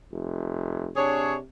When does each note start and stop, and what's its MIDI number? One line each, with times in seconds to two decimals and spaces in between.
0.12 0.91 29
0.96 1.44 48
0.96 1.35 62
0.96 1.35 68
0.96 1.35 73